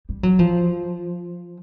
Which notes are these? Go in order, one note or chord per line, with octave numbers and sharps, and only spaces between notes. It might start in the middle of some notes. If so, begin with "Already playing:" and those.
G3
F#3
F3